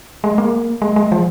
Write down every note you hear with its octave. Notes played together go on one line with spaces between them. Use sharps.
G#3
A#3
G#3
G#3
F3